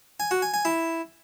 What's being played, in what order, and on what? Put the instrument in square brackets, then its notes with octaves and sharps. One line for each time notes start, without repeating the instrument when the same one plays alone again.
[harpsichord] G#5
F#4
G#5
G#5
E4